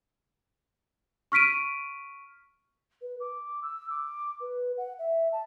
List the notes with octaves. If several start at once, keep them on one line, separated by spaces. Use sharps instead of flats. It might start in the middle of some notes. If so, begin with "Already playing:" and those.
C#6 F6 B6 D7 D#7
B4
D6
E6
D6
B4
F#5
E5
A5